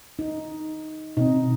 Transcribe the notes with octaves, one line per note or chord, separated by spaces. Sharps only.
D#4
B2 C4 D#4